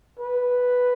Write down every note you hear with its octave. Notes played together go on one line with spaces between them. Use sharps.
B4